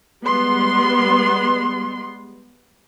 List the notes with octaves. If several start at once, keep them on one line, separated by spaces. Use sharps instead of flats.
G3 G#3 B3 C6